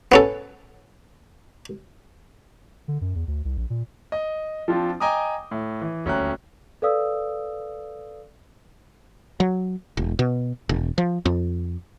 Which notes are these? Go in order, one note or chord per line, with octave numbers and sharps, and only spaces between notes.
B3 C#4 A4
D3
F#2
E2
D2
C2
A#1
A#2
D#5
F3 C4 D4 F4
D#5 G5 G#5 A#5 D6 D#6
A2
E3
D#1 D2 C#4 G5 A#5 F#6
A4 B4 D5 F5 D#6 E6
F#3
E1
B2
E1
F3
F2